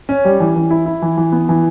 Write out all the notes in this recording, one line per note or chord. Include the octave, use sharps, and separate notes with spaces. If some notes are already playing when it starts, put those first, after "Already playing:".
C#4
G3
E3
E3
E4
E4
E3
E3
B3
E3